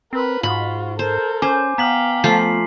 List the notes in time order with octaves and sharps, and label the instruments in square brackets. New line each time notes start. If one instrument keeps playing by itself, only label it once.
[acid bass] C4 [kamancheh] A#4 B4
[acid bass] G#2 [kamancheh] F4 F#4 [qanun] B5
[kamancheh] A4 A#4 [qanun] C5
[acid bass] C#4 [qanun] C5 [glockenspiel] G#5 D6
[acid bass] B3 [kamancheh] F5 G5 [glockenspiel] A#5 B6 F#7
[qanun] F3 A3 F4 [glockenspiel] C7